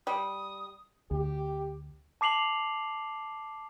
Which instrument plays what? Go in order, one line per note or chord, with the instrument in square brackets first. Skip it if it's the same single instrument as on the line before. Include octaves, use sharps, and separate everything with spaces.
[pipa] G3 [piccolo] D#6
[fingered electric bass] D2 [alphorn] G4
[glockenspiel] A5 D6 C7 F7 F#7